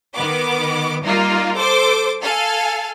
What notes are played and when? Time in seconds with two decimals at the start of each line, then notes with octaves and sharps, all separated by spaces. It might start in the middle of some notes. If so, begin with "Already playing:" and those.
0.15 D#3 B3 D6
1.03 G3 A#3 D#4 F4
1.56 A4 C5 D6
2.22 A4 F5 G#5